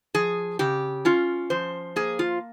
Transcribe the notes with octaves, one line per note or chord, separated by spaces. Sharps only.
F3 G#4
C#3 G4
C#4 F4
F3 C5
A#3 G#4
F4